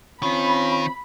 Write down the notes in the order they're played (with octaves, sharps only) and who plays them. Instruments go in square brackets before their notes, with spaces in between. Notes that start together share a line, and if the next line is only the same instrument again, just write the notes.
[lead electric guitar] D#3 [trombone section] C4 C#4 F4 [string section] B5